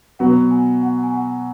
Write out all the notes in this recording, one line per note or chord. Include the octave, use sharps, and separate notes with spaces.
B2 F#3 B3 F#5
G#5
F#5
G#5
F#5